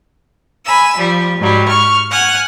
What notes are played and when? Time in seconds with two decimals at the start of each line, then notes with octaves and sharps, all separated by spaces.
0.65 G#5 B5 E6
0.97 F3 G3
1.38 G#2 F#3 G3
1.68 C#6 F6
2.11 F#5 G#5 F6 F#6